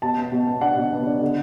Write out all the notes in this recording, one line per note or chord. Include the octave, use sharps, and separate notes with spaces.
B2 A5
B3
B2
B3
D4 F#5
B2
B3
D4
D3